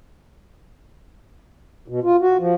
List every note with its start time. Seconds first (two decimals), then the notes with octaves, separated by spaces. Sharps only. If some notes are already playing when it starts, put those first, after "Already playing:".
1.88 B2
2.03 F4
2.21 F#4
2.39 F3